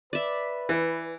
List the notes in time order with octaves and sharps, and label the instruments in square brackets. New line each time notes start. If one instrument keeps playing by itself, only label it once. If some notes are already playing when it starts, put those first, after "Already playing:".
[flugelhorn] B4 [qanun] D5 E5
[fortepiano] E3